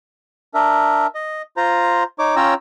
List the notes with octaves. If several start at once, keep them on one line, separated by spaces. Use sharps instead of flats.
D4 A#4 E5
D#5
F4 C5 A#5
D#4 C#5 D6
C#4 F4 C#5 G5 A#5 E6